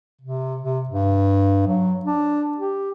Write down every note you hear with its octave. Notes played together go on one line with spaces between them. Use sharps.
C3
C3
G2
F#3
D4
G4